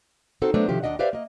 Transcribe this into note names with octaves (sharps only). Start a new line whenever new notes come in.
C4 D#4 F#4 A4 C5
F#3 A3 B3 D4 C5 C#5
C3 D#3 F3 G4 C5
D#2 B2 D4 D#5 F#5
G4 B4 C5 D5 E5 F5
A#3 D#5